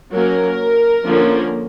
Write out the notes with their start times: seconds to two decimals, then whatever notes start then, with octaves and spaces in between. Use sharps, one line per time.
0.11 F#3 A#3 C#4 A#4
1.05 D3 F3 A#3 C#4